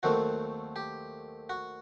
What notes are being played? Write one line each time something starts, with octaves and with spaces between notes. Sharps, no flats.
D#2 D#3 F#3 A3 C4 F#4
G4
F#4